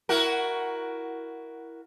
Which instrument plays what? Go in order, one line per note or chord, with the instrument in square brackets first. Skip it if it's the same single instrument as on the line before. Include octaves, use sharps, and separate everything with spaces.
[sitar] E4 F#4 A#4